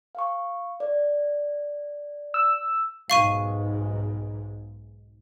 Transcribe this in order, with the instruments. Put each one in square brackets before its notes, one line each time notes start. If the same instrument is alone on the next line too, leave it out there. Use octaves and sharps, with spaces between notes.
[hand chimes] F5 C#6
D5
[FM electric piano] E6
[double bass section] B1 G#2 [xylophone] F5 C#6 D#7